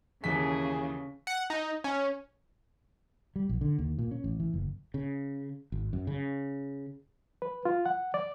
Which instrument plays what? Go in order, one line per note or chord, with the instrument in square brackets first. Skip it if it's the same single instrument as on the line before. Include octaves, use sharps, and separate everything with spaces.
[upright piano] D#2 E3 B6 [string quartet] C#3 [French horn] G#4
[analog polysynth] F#5
D#4
C#4
[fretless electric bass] G3
A#1
D3
D#2
A#2
C#4
A1
E3
F#1
C#3
G#1
F#2
C#3
[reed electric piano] B4
F4
F#5
D5